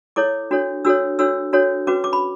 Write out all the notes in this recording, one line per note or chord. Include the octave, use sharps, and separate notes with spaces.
E4 A4 C#5 D6
D4 F#4 A4 C#5
D4 F#4 A4 C#5 E6
D4 F#4 A4 C#5 E6
D4 F#4 A4 C#5
C#4 F#4 B4 D6
D6
B5